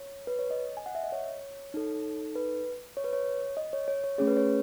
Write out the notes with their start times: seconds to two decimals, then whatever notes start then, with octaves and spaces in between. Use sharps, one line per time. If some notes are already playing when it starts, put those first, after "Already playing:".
Already playing: C#5
0.27 B4
0.39 C#5
0.51 D#5
0.77 G#5
0.86 F#5
0.95 E5
1.03 D#5
1.12 C#5
1.74 D#4 A4
2.35 B4
2.97 C#5
3.04 B4
3.13 C#5
3.57 D#5
3.73 C#5
3.88 C#5
4.04 C#5
4.18 A3 C#4 G#4 C#5
4.28 B4
4.37 C#5